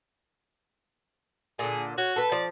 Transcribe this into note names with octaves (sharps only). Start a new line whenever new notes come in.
A#2 D3 G#4
F#4 C#5
A4 B4
F3 D5